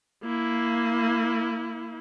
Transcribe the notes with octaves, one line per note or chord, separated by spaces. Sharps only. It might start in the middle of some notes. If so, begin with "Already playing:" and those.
A#3 E4